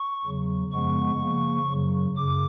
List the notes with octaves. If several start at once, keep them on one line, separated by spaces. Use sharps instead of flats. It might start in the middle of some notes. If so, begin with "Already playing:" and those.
Already playing: C#6
E2 C#3 F#3
F#2 C#3 F3 G#3 B3 C#6
C#3 F3 A#3
F#2 C#3 F#3
F#2 C#3 D6